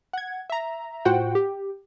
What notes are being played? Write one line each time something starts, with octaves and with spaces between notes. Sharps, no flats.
F#5 G#6
E5 A#5
A2 F4 F#4 C5 F#5 G5
G4